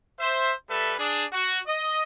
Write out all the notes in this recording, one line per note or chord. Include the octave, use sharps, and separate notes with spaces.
C5 E5
G3 A4 B4 E5
D4 G#4
F#4
D#5